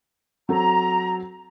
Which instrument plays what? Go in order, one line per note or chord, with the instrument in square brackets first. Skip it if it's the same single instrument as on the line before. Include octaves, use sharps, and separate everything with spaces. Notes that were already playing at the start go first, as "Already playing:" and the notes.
[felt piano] F#3 C4 A4 [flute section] A#5